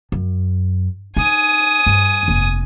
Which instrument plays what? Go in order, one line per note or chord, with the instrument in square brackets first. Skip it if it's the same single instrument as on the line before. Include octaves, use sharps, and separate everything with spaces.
[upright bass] F#2
[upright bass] D#4 [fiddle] G#5 D#6
[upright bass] G2
F1 A#3